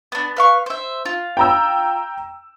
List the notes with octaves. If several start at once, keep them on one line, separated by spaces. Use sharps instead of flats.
B3 D4
B4 F5 C#6
C5 E5
F4
G5 A#5 E6